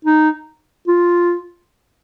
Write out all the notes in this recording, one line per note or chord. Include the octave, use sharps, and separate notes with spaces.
D#4
F4